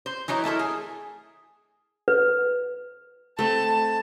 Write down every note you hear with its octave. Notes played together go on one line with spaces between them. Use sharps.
C5
E3 F#3 D#4 E4
A3 E4 A4 A#4
G#4
B4
A3 C4 A5